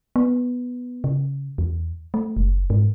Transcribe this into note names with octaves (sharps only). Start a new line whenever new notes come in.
B3
C#3
E2
A3
F#1
G#2